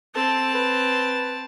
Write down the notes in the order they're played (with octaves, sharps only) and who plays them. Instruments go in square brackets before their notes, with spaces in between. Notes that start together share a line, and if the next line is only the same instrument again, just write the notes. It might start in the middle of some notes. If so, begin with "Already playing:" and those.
[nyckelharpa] C4 A5 [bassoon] A4
[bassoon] B4